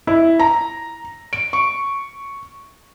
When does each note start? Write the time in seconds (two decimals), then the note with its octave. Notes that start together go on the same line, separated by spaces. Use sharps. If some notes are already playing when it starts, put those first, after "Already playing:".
0.07 E4
0.40 A#5
1.33 D7
1.53 C#6